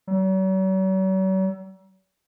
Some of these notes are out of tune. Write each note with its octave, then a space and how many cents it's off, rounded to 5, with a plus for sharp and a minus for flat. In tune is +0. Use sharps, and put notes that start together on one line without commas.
F#3 +45